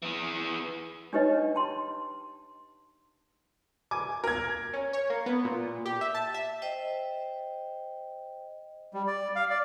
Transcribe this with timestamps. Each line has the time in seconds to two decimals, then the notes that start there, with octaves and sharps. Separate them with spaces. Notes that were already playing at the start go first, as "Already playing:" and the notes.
0.02 E3 G#4
1.13 D4 D#4 G4 B4 C#5 D#5
1.55 G5 A5 C6
3.91 G#5 D6
4.24 A#4 G#6
4.73 C#4
4.93 C#5
5.10 A#3
5.26 B3
5.45 A#2
5.86 G4
6.01 E5
6.14 A5
6.34 E5
6.62 C5 D#5 G5
8.94 G3
9.07 D5
9.36 F5
9.50 D5